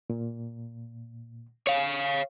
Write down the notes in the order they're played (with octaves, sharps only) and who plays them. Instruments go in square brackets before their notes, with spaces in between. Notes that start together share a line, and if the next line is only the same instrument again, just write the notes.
[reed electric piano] A#2
[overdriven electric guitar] C#5 F5